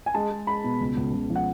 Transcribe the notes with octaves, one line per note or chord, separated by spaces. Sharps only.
G#5
G#3 A5
G#3
G#3 B5
B2
C#2
C#2
C#2
F3
F#5